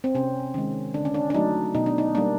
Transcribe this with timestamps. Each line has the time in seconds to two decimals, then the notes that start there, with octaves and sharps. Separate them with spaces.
0.04 C4
0.15 C3 C#4
0.54 D#3 G#3 C#4
0.94 D3 D4
1.05 C#4
1.14 D4
1.30 D4
1.34 F#3 A3 D#4
1.75 B2 D#4
1.86 D4
1.98 D#4
2.15 G3 A#3 D4